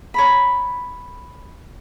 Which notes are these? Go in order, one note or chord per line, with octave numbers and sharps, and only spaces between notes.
C#5 A#5 B5